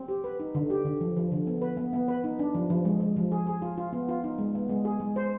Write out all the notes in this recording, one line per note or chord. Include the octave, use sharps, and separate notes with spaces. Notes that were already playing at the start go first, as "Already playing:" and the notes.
Already playing: C4
G4
B4
D#4
D3
G4
D3
F3
F3
D3
B3
B4
B3
B3
B4
D#4
D4
F3
F3
G#3
G#3
F3
G#4
G#4
F4
F4
B3
F4
D#4
G#3
B3
G#3
G#4
G#3
C5